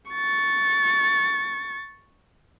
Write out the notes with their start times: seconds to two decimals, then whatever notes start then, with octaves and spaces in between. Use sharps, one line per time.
0.11 C#6 A6